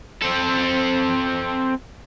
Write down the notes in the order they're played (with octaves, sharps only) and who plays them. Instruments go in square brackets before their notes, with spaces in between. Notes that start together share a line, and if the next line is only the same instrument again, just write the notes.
[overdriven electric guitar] C4 A4